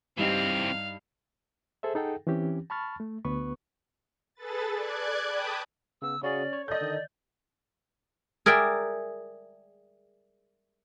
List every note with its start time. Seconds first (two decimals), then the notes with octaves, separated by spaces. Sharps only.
0.18 G2 E3 C4 D#4 G4 F5
1.83 G#4 A4 C5 E5
1.95 D#4 G#4 A4 F#5 G5
2.27 E3 C4 C#4 G4
2.70 A5 B5 C#6 F6 A6
3.00 A3
3.25 D2 B3 B4 C#6
4.35 G#4 A4 B4 A6
4.73 D5 F#6 G#6
5.29 G5 A5 B5 D6 D#6
6.02 C#3 B3 E6
6.23 C#3 C#4 F#4 G#4 D5
6.53 C#5
6.68 A4 D5 D#5 G6
6.81 D3 D#3
8.46 G#4 A#4 D5 E5 G5